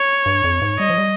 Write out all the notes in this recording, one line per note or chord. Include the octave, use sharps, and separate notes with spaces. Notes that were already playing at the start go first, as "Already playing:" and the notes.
Already playing: C#5
G2
F2
G#2
G3 D#5
F3
G3